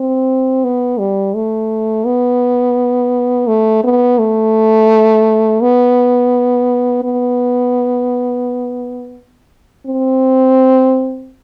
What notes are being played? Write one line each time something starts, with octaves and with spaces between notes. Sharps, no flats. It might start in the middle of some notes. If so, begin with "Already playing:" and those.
Already playing: C4
B3
G3
A3
B3
A3
B3
A3
B3
B3
C4